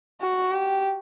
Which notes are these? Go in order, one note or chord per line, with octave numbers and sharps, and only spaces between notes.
F#4
G4